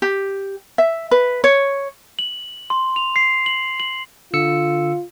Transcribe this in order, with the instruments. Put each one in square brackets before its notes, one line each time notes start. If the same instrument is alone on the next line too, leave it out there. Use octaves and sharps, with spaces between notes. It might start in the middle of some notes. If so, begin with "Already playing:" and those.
[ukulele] G4
E5
B4
C#5
[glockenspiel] F#7
C6
F7
C7
F#7
F#7
[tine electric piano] D3 E6 C#7 [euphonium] F4